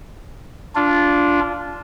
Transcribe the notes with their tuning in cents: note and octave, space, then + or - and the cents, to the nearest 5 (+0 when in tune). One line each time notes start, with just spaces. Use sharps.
D4 -15 F4 +0